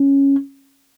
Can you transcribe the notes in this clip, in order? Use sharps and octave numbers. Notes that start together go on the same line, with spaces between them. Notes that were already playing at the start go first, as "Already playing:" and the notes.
Already playing: C#4